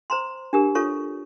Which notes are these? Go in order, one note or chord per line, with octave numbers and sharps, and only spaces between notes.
C5 A#5 C6
D4 G4 A#4
F4 A4 C#5 C#6